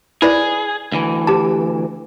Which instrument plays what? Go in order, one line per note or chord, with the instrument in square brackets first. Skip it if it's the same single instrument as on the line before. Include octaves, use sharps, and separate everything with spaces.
[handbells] E4 B4 D5 [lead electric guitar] G#4
[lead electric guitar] D2 E3
[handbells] G4 A5